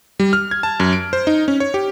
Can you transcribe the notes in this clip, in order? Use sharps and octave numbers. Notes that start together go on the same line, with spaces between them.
G3
F6
G#6
A5
F#2
D7
C5
D#4
C#4
C#5
G4